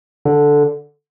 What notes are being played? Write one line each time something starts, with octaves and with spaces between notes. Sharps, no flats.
D3